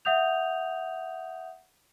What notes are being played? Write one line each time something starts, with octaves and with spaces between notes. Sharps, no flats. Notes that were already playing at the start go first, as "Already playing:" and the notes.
E5 F#5 D#6 G6 F7